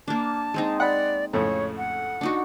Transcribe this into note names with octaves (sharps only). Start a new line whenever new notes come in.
A#3 D4 A5
G#3 C4 D#4
D5 F#5 B5
F2 A2 C#3 C#5
F#5
D4 D#4 F#4